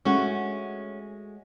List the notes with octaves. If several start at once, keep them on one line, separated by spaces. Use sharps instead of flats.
G#3 A3 C#4 F#4